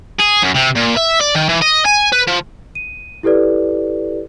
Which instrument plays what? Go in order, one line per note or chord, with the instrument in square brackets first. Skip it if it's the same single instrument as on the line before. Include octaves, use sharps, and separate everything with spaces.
[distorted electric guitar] G#4
F#2
C3
A#2
E5
D5
D#3
E3
D#5
G#5
B4
F3
[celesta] D#7
E4 G4 A4 B4 D5